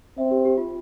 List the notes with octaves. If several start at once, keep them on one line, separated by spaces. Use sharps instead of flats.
C4 E5
G4
G4
F4